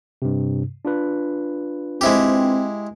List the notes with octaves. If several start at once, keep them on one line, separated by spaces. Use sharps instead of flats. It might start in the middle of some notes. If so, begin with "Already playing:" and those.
G2 C3
D4 F4 B4
G#3 C4 E4 G4